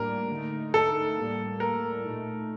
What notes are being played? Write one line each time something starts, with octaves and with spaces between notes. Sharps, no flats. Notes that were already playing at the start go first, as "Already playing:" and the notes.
Already playing: A2 G3 A#3 D4 A#4
D3 A3 D#4
A4
A2 G3 A#3
A#4
A#2 A3 D#4